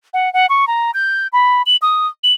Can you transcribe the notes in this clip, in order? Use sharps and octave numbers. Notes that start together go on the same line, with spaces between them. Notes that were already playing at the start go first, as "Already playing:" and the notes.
F#5
F#5
C#6
A#5
G6
B5
F#7
D#6
F#7